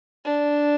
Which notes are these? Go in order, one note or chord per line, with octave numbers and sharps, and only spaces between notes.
D4